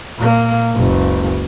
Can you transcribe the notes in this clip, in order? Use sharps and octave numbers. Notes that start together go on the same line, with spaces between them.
A#2 A#3
F#1 C#2